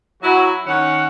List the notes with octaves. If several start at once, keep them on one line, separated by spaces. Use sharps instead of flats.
F#3 E4 F#4
D#3 C#4 F#5